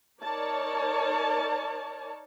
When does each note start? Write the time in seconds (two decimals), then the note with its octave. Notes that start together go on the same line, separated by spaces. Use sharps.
0.22 D#4 A#4 C#5 D5 A5